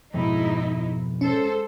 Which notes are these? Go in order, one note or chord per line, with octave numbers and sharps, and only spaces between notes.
F2 G#2 B2 D#4 E4
G#3 C#4 A4 C5